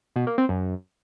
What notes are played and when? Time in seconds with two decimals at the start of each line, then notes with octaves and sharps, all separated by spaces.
0.16 B2
0.27 A#3
0.38 C4
0.49 F#2